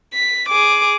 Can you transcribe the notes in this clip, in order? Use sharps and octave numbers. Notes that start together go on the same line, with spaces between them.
B6
G#4 D6